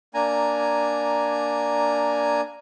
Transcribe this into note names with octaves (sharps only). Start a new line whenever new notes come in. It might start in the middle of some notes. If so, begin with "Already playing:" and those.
A#3 D4 G#5 A#5